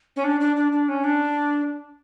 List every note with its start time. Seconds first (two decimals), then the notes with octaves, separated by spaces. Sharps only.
0.16 C#4
0.24 D4
0.41 D4
0.56 D4
0.72 D4
0.89 C#4
1.04 D4